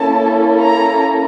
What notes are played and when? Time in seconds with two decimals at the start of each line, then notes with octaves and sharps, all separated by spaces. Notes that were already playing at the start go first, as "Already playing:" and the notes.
Already playing: A#3 C#4 E4 A4 A5
0.60 A#5